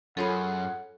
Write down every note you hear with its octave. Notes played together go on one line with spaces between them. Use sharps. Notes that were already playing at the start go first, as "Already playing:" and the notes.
F#2 C#4 F4 G#4 A4 C#5 F#5 B5